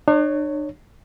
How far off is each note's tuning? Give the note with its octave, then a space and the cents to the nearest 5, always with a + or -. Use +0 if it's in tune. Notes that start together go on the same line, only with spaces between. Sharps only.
D4 +45 C#5 +0